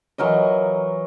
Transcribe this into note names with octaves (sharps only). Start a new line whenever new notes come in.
E3 F#3 A#4 D#5